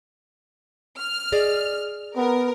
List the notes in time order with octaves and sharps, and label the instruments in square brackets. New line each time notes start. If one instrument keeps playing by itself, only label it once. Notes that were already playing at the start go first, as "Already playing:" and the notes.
[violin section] F6
[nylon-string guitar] G#4 D5 D#5
[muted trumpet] B3 [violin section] A#4